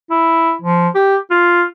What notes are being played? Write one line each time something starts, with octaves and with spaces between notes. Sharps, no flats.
E4
F3
G4
F4